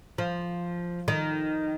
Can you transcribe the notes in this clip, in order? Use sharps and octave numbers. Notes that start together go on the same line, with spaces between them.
F3
D#3